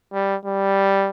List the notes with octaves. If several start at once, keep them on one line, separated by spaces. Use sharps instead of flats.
G3
G3